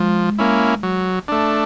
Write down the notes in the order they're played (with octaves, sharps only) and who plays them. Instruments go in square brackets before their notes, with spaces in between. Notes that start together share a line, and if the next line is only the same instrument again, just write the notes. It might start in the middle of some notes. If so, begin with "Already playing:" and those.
Already playing: [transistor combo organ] F3 [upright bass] G#3
[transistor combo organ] A#3 C#4 E4
F#3
A3 D4